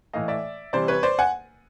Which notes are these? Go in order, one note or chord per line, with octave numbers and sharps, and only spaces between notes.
A2 E3 A3 D#5 F5
D5 E5
C3 E3 G3 C5 D5
B4 C#5
C5 D5
F#5 G#5